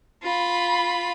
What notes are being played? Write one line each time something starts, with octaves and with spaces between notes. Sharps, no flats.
F4 B5